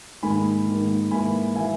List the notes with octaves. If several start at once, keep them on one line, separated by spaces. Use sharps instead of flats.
G#2 D#3 A#3 G#5 B5
G#2 D#3 A#3
G#2 E3 A#3 G#5 B5
E3 A#3 E5 G#5